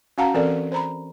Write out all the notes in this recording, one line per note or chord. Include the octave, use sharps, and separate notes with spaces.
C#4 F#4 F5 F#5 A5 A#5
E3 C4 A4 A#4 D5
C5 A#5 B5